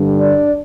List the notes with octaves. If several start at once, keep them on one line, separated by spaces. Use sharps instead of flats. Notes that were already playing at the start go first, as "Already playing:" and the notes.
Already playing: G2 D3 G3
D4 D5